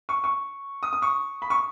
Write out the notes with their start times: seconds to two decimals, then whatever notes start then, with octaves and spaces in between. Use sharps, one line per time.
0.09 C#6
0.24 C#6
0.83 D#6
0.93 D#6
1.02 C#6
1.42 B5
1.50 C#6